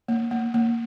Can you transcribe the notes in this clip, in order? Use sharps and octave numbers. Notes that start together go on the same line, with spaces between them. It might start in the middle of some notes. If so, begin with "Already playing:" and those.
A#3
A#3
A#3